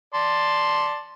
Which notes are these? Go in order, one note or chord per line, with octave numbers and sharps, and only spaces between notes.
D5 A5 C6